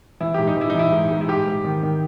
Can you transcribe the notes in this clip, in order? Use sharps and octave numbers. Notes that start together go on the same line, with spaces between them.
E3 E4
G#2 G4
D#4
E3 E4
D#4
E3 E4
G#2
G#2
E4
G#2 G4
G#2
D#3
D#3